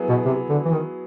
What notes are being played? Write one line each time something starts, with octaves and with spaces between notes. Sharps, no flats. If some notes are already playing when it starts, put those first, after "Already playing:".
Already playing: F#3 B3 E4 G#4
B2
C3
D3
E3
D#3